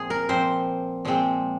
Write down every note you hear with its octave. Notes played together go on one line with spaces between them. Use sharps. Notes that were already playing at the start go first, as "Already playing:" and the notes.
Already playing: A#2 F3 C4 G#4
A#4
A#2 F3 C4 C5
A#2 F3 G#3 C4